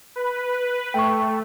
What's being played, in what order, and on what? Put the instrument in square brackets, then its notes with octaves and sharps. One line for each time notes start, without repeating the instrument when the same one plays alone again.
[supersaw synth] B4
[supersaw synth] A3 [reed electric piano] G5 C#6